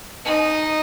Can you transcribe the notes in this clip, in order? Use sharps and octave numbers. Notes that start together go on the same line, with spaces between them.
D#4